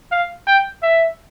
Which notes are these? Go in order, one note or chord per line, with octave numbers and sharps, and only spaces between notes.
F5
G5
E5